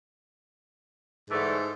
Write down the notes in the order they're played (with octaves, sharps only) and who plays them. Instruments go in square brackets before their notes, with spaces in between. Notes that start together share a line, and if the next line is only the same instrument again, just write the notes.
[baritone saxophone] G#2 [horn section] D3 E3 A3